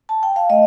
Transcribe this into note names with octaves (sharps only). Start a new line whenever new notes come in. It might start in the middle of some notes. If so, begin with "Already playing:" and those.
A5
G5
F5
A3 D#5